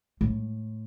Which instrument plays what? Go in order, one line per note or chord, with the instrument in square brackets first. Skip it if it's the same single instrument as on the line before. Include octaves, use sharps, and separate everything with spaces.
[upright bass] A2